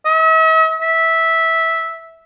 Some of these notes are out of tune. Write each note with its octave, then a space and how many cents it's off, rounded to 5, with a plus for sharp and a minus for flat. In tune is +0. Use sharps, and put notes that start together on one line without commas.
E5 -45
E5 -10